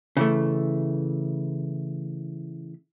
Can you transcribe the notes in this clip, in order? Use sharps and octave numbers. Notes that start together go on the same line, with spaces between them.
C#3 E3 A3